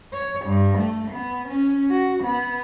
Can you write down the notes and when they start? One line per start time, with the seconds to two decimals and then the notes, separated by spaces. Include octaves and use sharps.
0.13 C#5
0.46 G2
0.79 A3
1.11 B3
1.49 C#4
1.91 F#4
2.24 B3